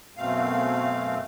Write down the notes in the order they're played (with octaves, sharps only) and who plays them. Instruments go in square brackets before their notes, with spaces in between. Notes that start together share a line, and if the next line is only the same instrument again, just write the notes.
[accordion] F#2 B2 A3 C4 F5